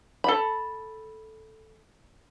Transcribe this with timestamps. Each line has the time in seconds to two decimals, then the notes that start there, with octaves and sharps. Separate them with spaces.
0.24 A4 B5